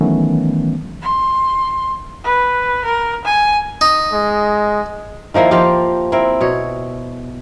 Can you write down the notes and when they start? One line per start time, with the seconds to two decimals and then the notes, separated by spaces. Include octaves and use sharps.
0.01 D#3 E3 F#3 A3 B3 C#4
1.02 C6
2.24 B4
2.84 A#4
3.24 G#5
3.81 D#4
4.12 G#3
5.34 D#3 F3 A#3 E4
5.51 F3 F4 G4
6.12 C4 E4 A#4
6.41 B2 C#5